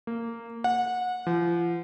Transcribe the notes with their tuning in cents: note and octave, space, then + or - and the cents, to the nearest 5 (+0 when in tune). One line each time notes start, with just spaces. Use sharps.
A#3 -15
F#5 -25
F3 -35